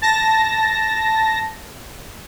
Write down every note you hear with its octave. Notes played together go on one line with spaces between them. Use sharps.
A5 A#6